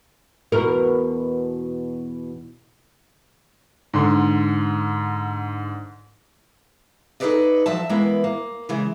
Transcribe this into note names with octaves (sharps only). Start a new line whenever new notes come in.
E2 B2 A#4
G#2 D3 C6
D#4 G#4 A4 B4 D5 D#5
F3 F#3 E5 A5
E3 G#3 A#3 B3 E4
A#3
C#3 E3 G#3